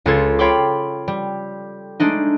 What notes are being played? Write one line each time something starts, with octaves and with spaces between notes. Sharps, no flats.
C#2 F4 A4 G#6
F4 C#5 G5 B5 C6 D6
G3
G#3 A3 D4 D#4